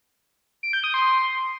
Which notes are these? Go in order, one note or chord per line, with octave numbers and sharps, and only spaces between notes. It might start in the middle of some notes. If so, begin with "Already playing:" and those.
D7
G6
D#6
C6